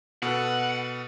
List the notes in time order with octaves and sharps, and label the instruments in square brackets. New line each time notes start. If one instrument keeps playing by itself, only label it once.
[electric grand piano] B2 A4 B4 [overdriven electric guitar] F#5